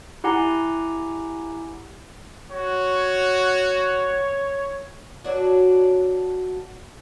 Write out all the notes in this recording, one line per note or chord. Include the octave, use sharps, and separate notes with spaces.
E4 G4 F#5 G#5 A#5
F#4 C#5
F#3 D4 F#4